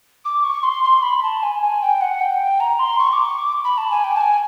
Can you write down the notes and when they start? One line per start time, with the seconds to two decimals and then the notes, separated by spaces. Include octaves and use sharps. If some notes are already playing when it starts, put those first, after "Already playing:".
0.24 D6
0.44 C#6
0.63 C6
0.83 C6
1.02 B5
1.23 A5
1.42 G#5
1.62 G#5
1.81 G5
2.00 F#5
2.20 G5
2.60 A#5
2.79 C6
2.98 C#6
3.12 D6
3.25 C#6
3.38 D6
3.64 B5
3.77 A5
3.90 G#5
4.04 G5
4.16 A5
4.20 G#5